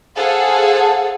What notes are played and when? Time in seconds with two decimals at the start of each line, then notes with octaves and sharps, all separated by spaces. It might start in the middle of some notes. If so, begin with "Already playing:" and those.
0.17 G#4 A4 C5 F5 F#5